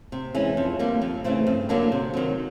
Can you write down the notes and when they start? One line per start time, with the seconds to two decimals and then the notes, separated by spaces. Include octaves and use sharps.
0.12 C3
0.35 E3 G#3 C#4
0.57 F2
0.79 D3 G3 A#3
1.02 F2
1.24 C#3 E3 A3 C4
1.47 G2
1.69 D3 F#3 A#3 D4
1.92 C3
2.14 D#3 F#3